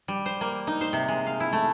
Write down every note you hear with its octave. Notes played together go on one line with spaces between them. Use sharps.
G3
C5
A#3
D#4
C5
C3
G#3
F5
E4
A3